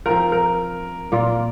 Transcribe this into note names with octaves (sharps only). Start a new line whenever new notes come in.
F3 C4 F4 A#4
A#4
A#2 A#3 F4